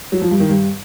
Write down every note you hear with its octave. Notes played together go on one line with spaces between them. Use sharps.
F#3
F3
G2
D#3
G2